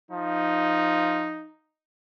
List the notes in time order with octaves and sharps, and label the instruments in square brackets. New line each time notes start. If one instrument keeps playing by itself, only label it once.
[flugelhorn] F3 [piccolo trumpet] D#4